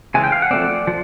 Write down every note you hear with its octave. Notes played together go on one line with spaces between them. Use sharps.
C#3 E3 G#3 G#5
G5
F5
F#5
F3 A3 C4 D5
F3